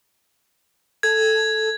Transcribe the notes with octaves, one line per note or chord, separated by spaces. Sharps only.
A4 G#6